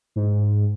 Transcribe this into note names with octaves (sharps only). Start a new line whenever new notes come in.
G#2